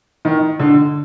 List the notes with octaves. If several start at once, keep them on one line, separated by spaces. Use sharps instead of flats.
D#3
D3